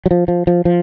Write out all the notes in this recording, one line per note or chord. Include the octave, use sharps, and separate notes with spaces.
F#3
F3
F3
F3
F3